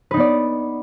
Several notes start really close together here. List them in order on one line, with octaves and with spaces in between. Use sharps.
B4 D#4 B3 D5